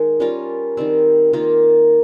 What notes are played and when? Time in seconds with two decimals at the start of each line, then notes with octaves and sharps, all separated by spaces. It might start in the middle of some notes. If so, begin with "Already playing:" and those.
Already playing: D#3 G#3
0.20 G3 C#4 F4 A#4
0.77 D#3 G3 C4
1.33 D#3 A#3 F4